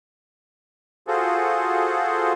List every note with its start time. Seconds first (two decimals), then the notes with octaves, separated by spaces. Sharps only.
1.08 F4 F#4 G#4 A4 C5